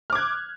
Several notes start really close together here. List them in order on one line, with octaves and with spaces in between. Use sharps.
F6 D6 G#6 F#6